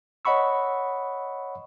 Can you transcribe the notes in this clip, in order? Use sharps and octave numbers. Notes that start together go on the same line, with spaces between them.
C#5 D#5 F#5 B5 C#6 E6